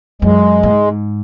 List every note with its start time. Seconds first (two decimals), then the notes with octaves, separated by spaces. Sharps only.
0.22 F#2 G#3
0.63 A#2
0.70 G#2